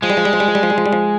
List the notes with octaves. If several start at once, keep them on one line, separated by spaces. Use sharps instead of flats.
F3 G#3
G3
F3
G3
F3
G3
F3
G3
F3
G3
F3
G3
F3